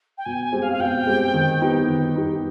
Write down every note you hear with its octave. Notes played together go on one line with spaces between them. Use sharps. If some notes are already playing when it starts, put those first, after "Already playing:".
G5
B2 G#5
G#5
G#3 C4 G4
F5
F5
B2 G5
G#3 C4 G4
D#3
B3 D#4 G4
D#3
B3 D#4 G4